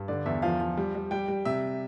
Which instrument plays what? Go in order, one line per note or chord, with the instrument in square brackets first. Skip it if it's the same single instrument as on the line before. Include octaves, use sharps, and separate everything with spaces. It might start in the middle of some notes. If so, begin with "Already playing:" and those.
Already playing: [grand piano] G2
D3 D5
E2 E5
F3 F5
F3
G3
G3
G3 G5
G3
C3 E5